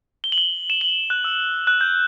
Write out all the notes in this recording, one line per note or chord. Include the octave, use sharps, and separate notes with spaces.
G7
F#7
G7
E7
F#7
F#6
E6
F#6
G6